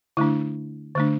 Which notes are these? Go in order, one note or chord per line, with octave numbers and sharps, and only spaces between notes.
D3 A3 D4 E4
D3 A3 D4